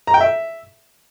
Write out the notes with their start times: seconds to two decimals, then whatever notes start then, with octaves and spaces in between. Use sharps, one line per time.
0.07 A#5
0.14 G5
0.21 E5